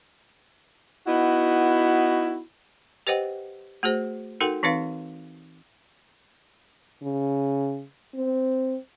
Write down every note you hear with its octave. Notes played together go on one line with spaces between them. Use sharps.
B3 D#4 E4 F#4
G4 B4 C5 D#5 F#5 G5
A3 F#4 G#4 C5
D#4 F#4 A4 A#4 F#5 G5
E3 C4 D#4 B4 F5
C#3
C4